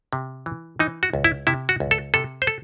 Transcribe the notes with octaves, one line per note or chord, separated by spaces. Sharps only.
C3
E3
E3 D#4
F#4
C#2
E4
C3 E4
F#4
C#2
A4
C3 A4
C5
A4